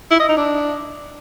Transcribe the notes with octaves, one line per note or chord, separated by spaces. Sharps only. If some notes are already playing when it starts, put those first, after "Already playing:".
E4
D#5
D#4
D4